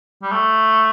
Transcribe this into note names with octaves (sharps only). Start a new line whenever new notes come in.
G3
A3